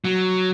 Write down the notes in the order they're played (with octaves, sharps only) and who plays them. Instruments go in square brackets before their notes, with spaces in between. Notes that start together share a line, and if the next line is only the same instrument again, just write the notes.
[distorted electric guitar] F#3